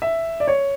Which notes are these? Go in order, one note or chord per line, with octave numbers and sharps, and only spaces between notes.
E5
D5
C#5